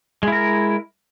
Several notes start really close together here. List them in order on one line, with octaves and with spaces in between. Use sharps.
G#3 E4 A#4